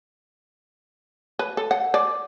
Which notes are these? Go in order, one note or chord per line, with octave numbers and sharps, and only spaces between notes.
B4
A4
F#5
D5